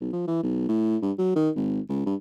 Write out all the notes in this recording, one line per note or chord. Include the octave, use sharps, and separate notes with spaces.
B1
F3
E3
B1
A2
G2
F#3
D#3
G#1
C#2
G2